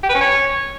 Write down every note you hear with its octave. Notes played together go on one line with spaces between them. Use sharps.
G4
B4
C#4
C#5